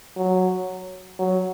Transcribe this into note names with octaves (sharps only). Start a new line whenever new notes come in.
F#3
F#3